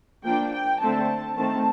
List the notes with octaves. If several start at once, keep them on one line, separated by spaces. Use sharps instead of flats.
F3 A#3 D4 G5
G5
D3 A3 C4 A5
D#3 A3 C4 A5